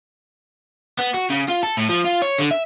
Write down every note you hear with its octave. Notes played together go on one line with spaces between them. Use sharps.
B3
F#4
C#3
F4
A4
A2
F3
F4
C#5
D3
E5